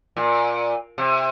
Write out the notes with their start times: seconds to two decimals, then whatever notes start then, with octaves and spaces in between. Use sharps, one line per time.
0.16 A#2
0.98 C3